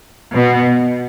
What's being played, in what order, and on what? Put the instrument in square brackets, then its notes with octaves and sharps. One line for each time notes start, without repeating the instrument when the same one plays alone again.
[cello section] B2